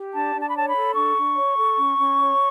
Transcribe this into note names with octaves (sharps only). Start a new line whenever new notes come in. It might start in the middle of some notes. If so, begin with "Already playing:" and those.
Already playing: G4
D4 A5
D4
A5
B5
C#5 A5
B5
A4
D4 C#6
D4
C#5
A4
C#4
C#4
C#5